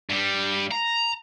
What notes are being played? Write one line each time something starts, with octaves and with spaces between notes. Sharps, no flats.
G2 G3
A#5